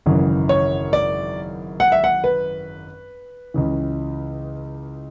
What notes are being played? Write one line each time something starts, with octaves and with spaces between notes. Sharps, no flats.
G#1 F#2 C#3 E3
C#5
D5
F#5
E5
F#5
B4
C#2 C#3 E3